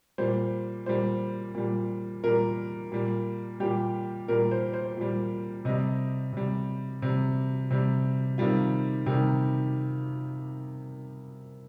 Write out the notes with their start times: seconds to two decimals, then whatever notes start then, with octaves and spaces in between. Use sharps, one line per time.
0.18 A#2 G3 C5
0.86 A#2 G3 C5
1.55 A#2 G3
2.24 A#2 G3 A#4
2.92 A#2 G3
3.60 A#2 G3 G4
4.28 A#2 G3 A#4
4.51 C5
4.74 C5
4.97 A#2 G3
5.65 C3 G3 D#5
6.33 C3 G3
7.02 C3 G3
7.71 C3 G3
8.38 C3 D#3 G3 F4
9.06 C3 D#3 G3 G4